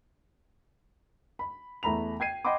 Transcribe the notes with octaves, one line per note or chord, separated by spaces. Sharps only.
B5
E2 A3 A#5 B5 F7
G5 G#6 C7 D#7
D#5 F#5 G5 B5 C6 D6